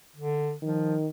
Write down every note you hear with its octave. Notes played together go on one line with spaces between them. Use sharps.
D3
D#3 F3